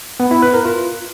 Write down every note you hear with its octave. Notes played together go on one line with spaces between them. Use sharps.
B3
E4
B4
A#4
F4